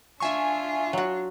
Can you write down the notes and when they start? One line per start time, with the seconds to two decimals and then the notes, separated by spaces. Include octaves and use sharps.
0.20 D4 F4 E5 G#5 C#6
0.93 F#3 F#4